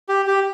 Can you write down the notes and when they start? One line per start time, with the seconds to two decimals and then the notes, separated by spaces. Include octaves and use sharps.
0.09 G4
0.27 G4